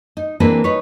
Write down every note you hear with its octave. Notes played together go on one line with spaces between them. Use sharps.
D#4
E3 A#3 C4 D4 G#4 B4
D#4 B4 C#5